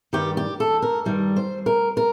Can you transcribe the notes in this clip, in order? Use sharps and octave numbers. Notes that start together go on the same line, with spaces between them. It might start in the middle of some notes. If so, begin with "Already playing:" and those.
G2 D#3 G3 G4
G4
A4
A#4
G2 D#3 G3
C5
A#4
A#4